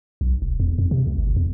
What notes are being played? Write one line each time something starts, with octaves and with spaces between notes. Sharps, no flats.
B1
E1
E2
F2
C3
C#2
G1
E2